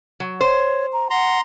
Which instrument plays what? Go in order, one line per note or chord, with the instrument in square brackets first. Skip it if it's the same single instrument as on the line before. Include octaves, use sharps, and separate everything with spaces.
[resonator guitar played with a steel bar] F#3
[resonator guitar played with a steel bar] C5 [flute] C#5
[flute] A#5
[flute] F#5 [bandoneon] A#5 C6